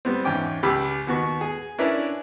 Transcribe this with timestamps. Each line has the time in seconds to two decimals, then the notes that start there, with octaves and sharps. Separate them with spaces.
0.05 G3 B3 C4
0.25 E2 G#2 C#4 G5 D6
0.63 C#2 G4 B5 E6
1.07 D#2 B3 F#4 C#6
1.41 G#4
1.78 C#4 D4 E4 A#4 B4 D5